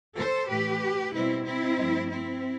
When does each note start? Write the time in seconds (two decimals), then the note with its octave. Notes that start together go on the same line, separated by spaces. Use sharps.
0.16 A4 C5
0.48 A2 E3 A3 G4 B4
1.13 B2 G3 C4 E4
1.45 C4 E4
1.78 G2 F3 A3
2.10 C4 E4